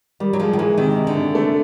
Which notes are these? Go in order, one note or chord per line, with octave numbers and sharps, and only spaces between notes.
D#3 G3
F#3
F3 G#3
D#3
E3 G#3
C3 D#3
C3
D3
C3
A3